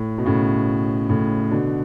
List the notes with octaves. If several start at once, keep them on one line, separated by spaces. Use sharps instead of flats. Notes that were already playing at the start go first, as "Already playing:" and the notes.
Already playing: A2
B2
A2 C#3
A2 C#3
B2 D3